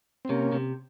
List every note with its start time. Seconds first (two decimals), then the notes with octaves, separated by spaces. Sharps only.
0.25 C4
0.29 C3 A#3 C#4
0.52 C3